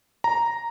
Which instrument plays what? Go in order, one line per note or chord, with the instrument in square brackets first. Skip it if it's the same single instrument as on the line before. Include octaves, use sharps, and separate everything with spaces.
[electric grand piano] A#5